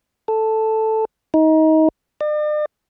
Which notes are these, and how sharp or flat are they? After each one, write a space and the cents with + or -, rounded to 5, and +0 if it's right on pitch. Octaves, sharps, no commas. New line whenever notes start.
A4 +0
D#4 +25
D5 +45